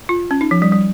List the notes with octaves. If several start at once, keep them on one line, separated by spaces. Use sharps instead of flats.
F4
C#4
D#4
F3
G3
G3